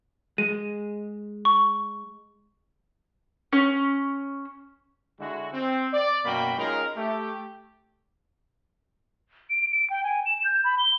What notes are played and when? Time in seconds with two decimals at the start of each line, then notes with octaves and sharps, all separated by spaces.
0.38 G#3 D#7
1.45 C#6
3.53 C#4
5.20 D3 G#3 E4 F#4
5.53 C4
5.93 D5
6.25 F#2 B2 A#3 F#4 G5 B5
6.58 G#3 C#4 D#4 F4 A#4
6.96 A3 G4
9.50 D7
9.72 D7
9.90 G5
10.04 G#5
10.26 E7
10.44 G6
10.64 B5
10.78 G7